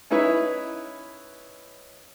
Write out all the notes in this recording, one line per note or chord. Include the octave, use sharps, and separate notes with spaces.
C#4 D#4 E4 B4 C#5